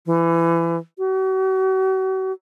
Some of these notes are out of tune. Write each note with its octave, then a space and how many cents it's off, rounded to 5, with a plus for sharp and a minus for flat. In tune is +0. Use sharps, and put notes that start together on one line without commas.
E3 +25
F#4 +40